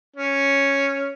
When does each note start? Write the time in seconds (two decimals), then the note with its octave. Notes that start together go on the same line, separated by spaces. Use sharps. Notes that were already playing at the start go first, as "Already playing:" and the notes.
0.17 C#4